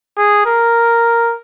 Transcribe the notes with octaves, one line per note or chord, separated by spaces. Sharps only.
G#4
A#4